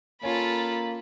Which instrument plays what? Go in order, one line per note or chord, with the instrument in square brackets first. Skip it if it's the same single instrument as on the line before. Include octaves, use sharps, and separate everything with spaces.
[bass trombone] A#3 [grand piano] C#4 [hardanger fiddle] F4 A4 [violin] B5